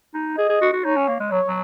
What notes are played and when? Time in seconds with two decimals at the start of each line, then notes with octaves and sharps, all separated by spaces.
0.14 D#4
0.38 G#4 D#5
0.49 G#4
0.61 F#4
0.73 F#4
0.85 D#4 C#5
0.96 C#4
1.08 A#3
1.20 G#3
1.31 F#3 C#5
1.48 F#3